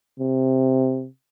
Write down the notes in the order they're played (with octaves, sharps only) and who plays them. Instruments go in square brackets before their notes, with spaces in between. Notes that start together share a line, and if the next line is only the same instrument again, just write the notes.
[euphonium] C3